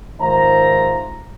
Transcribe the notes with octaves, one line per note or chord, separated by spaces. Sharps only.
G#2 D#3 F3 C5 E5 A#5